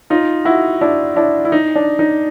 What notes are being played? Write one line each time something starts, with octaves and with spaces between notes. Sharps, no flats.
D#4 F4
E4 F#4
D4 E4
D4 E4
E4
D#4
D4
D#4